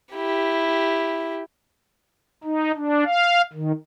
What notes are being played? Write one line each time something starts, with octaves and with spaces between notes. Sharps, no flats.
E4 G4
D#4
D4
F5
D#3